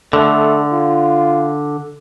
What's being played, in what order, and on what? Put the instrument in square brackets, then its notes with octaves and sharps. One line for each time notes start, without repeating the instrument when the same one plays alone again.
[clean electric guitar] D3 [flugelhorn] A3
[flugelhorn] F4